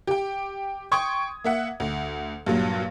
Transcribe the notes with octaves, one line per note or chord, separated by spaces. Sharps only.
G4 G5
G5 C6 C#6 D#6 G#6
A#3 E5 F#5
D2
G2 A#2 F#3